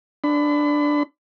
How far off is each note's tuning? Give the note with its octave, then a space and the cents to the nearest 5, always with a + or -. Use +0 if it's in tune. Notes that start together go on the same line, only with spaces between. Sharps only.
D4 +0 B5 +35